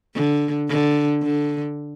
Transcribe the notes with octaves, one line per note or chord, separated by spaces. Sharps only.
D3
D3
D3